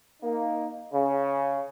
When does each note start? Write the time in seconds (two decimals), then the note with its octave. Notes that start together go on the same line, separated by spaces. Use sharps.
0.21 A#3 D#4
0.92 C#3